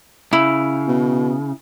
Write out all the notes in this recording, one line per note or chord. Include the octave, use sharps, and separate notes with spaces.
C#3 E4
B2